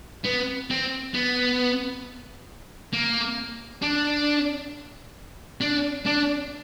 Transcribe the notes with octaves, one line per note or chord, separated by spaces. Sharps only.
B3
C4
B3
A#3
D4
D4
D4